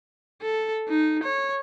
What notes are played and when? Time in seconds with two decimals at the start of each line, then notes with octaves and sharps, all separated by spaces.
0.42 A4
0.88 D#4
1.23 C#5